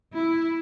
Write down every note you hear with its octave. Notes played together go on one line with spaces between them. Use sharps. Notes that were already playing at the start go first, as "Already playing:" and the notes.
E4